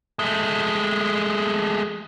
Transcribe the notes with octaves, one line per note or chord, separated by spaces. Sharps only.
G#3 A3